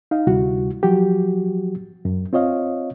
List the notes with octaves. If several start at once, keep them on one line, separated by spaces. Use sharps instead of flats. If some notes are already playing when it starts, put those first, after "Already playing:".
D#4 F5
D2 C3 G3 E4 F#4
F3 F#3 F#4 G4
F#2
C4 F4 C#5 D#5 F5